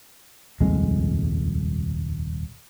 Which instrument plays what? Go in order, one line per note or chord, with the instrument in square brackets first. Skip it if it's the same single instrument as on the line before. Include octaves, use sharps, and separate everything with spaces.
[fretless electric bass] D#1 C2 F2 G#3